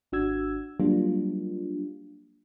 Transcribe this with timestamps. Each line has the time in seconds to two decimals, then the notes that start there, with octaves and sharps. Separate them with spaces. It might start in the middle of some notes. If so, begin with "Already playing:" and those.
0.12 G#1 D4 F#4 E6 G#6
0.80 F#3 G3 A#3 D4 F4